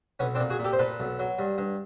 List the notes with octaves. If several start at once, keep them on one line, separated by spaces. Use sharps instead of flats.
B1 B3 C#4
C4 D4
A#2
F#4 G#4
A#2
G4 A4
C5
A#2 A4 B4
B1
F#3
G2
G2